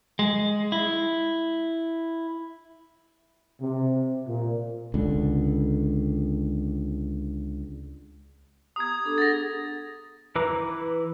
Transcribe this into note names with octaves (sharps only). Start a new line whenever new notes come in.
G#3
E4
C3
A#2
C#2 D3
B3 G4 A#5 D#6 G#6
B3 D4 A4
G#4 F#5 A6 A#6
E3 E4 B4 A#5 D6